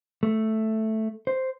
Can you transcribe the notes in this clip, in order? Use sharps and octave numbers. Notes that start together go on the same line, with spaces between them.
A3
C5